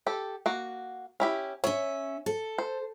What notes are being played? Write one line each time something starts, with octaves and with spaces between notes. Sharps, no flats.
G4 A4
A#3 F#4
C#4 E4 G4
C#4 C#5 E5
A4
C5